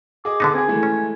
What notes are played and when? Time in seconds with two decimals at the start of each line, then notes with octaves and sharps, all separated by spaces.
0.25 G#4 D#5 D6
0.40 D3 B3 D#4
0.54 C4 G#4 G#5
0.68 E3 G#3 A3
0.83 C#4